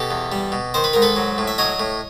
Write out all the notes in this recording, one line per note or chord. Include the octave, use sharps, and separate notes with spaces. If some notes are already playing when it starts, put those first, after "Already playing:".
Already playing: B2 G4 A4
E2
G3
B2
D#3 C5
B4
G#2 A#4
A4 B4
F#3
A2
E5
F#3 C#5 D#5
A2